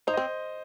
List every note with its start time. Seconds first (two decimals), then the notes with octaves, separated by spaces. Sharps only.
0.07 D#4 C5
0.13 D#5
0.17 C4